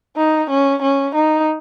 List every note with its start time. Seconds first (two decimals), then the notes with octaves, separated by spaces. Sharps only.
0.17 D#4
0.50 C#4
0.82 C#4
1.15 D#4